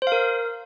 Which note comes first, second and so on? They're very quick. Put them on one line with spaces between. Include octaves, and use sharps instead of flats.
C5 F5 A#4